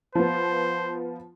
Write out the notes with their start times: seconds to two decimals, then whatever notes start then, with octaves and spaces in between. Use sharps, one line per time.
0.15 F3 B3 C5